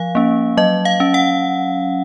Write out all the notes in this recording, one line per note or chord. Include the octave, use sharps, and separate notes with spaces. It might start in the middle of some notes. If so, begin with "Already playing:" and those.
Already playing: F3 F5
A#3 C#4
F#3 D#5
F5
C#4
F#5